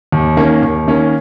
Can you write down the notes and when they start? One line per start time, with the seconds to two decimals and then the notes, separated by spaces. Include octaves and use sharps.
0.12 D#2
0.37 D#3 A#3 C#4
0.62 D#2
0.87 D#3 A#3 C#4